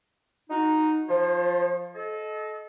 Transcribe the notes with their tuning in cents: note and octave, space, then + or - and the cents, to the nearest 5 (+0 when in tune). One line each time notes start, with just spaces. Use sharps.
D#4 +0 F#4 -20
F3 +5 C5 +45
A4 -30 D#5 +5